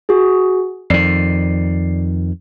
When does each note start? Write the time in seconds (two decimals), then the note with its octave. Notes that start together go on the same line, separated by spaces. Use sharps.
0.09 F#4 G#4
0.90 F2 D#3 D5 C7